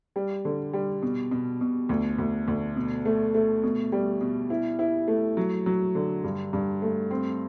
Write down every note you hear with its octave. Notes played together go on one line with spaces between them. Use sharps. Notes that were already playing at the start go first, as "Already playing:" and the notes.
G3
D3
G3
B2
B2
B2
D2
D2
D2
B2
A3
A3
B2
G3
B2
E4
E4
A3
F#3
F#3
D3
G2
G2
A3
C4